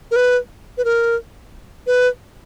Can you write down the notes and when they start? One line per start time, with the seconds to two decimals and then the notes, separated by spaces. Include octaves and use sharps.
0.11 A#4
0.16 B4
0.78 B4
0.85 A#4
1.87 B4